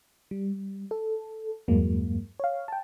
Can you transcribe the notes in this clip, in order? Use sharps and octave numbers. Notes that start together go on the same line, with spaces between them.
G3
A4
E2 G2 F#3 G#3 A#3
C#5 F5
G5 A5